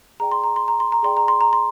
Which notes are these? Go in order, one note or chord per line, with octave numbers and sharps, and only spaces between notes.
G#4 D5 G5 A#5
C6
A#5
C6
A#5
C6
A#5
G#4 D5 G5 C6
A#5
C6
A#5
C6